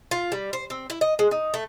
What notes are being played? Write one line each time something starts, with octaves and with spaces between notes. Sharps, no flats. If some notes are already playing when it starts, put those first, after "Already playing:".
F4
G3
C5
C4
E4
D#5
G#3
D#4
A3